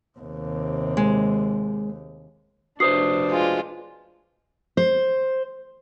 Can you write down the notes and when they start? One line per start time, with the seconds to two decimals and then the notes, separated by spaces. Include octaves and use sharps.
0.19 D#2 C3
0.97 G#3
2.80 F1 D4 F#4 B4 C5 D#6 C7
3.28 G#3 F4
4.77 C5